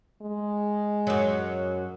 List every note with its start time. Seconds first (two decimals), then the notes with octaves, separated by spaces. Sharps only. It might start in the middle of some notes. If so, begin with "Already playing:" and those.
0.22 G#3
1.07 F#2 F#3